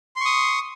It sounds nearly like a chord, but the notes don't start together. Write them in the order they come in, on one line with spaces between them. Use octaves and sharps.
C6 C#6 D#6